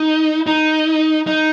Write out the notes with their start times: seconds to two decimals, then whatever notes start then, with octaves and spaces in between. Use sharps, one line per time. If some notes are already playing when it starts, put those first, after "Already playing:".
Already playing: D#4
0.47 D#4
1.27 D#4